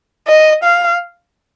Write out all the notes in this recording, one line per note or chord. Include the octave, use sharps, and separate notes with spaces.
D#5
F5